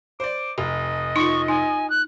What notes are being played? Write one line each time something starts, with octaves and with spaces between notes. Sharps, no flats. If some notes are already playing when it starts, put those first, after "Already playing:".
C5 D5 D6
F1 D#5
D#4 F4 C#6
D#4 G#5
F#6